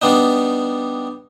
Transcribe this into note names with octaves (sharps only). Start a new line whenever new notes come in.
G3 B3 D4 D#4